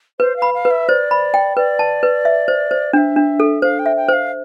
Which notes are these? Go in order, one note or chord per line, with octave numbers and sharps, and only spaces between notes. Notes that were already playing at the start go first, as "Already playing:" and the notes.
B4 C5
F5
B5
F5
B4
E5
C5 D5
B5
G5
B4 D5
A5
B4
E5
C5
C5
D4 E5 G5
D4
A4
C5 F5
G5
E5
G5
C5 F5